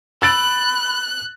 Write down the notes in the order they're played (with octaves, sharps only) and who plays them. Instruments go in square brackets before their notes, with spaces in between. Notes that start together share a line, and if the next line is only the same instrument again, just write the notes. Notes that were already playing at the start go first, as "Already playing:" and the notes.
[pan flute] B5 [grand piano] E6 A6 D7 [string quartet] F#6